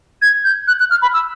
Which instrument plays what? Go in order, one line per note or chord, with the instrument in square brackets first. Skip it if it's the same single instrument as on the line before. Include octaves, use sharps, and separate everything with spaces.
[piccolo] G#6
G6
F#6
F#6
F6
B5
E6